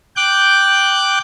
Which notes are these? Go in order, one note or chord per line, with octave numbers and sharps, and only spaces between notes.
G5 D6 F#6 G6